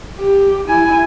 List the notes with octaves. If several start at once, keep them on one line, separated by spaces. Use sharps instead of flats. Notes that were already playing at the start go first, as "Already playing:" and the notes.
G4
E4 G#5